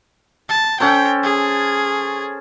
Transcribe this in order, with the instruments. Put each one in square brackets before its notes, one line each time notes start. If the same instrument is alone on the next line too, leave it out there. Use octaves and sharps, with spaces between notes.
[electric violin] A5
[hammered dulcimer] C#4 A4 C5 [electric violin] G5
[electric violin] G#4